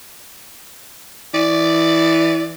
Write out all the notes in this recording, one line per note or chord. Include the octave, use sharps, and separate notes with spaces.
E3 D5